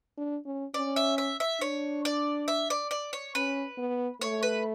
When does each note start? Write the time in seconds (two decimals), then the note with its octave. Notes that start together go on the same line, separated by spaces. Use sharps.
0.17 D4
0.45 C#4
0.74 C#4 D5
0.96 E5
1.18 E5
1.40 E5
1.61 D4 C#5
2.05 D5
2.48 E5
2.70 D5
2.91 D5
3.13 C#5
3.35 C#4 B4
3.78 B3
4.21 A3 C#5
4.43 B4